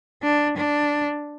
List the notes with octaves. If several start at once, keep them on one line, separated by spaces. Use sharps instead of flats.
D4
D4